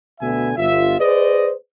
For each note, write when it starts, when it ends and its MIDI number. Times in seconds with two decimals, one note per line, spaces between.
0.21 0.52 38
0.21 0.52 47
0.21 0.52 50
0.21 0.52 59
0.21 0.52 76
0.21 0.52 80
0.57 0.97 31
0.57 0.97 65
0.57 0.97 76
1.00 1.52 68
1.00 1.52 71
1.00 1.52 72
1.00 1.52 74
1.00 1.52 75